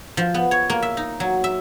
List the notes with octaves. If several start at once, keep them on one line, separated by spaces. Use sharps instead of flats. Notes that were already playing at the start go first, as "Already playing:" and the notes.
F3
B3
C#5
A#3
E5
D#4
F#3
E5